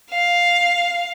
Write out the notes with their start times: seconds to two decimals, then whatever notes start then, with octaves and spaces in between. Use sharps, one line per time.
0.11 F5